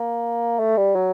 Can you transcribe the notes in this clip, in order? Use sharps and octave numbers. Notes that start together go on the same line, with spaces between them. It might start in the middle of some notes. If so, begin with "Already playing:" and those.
Already playing: A#3
A3
G3
F#3